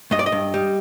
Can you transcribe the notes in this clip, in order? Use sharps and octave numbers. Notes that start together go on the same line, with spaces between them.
G2 D#5
D5
D#5
G2
G3